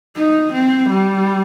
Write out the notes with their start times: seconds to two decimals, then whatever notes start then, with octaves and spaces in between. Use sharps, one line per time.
0.16 D#4
0.53 C4
0.90 G3